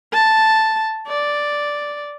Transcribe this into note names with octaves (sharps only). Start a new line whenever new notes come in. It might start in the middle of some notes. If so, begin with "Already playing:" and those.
A5
D5